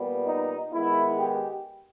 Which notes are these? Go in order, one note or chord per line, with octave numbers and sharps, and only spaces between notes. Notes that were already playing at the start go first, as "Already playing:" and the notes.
Already playing: A#2 G3 B3
D#4
D#3 G#3 B3 E4
G4